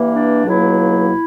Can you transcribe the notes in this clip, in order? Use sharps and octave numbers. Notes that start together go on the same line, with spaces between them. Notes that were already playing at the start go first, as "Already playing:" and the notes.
Already playing: G2 E3 A#3
D4
C#2 B2 F#3 A#3 E4